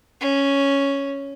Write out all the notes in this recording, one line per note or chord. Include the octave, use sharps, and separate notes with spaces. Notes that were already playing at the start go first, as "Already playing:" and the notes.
C#4